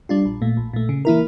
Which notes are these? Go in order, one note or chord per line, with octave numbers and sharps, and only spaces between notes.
G3 D4 F4
A#1
A#2 A3
A#1
A#2 A3
C#3
E3 A#3 E4 A#4